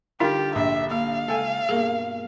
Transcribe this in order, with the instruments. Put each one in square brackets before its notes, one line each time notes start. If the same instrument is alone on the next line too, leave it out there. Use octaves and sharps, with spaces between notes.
[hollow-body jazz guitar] D3 G3 G5 [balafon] D#4 A#4 [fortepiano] F4 [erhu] G4
[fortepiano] A#1 [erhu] E5
[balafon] A#3 [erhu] F5
[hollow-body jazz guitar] C#2 G5 G#5 [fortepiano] A4
[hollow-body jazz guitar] G2 B2 A#3 [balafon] G#4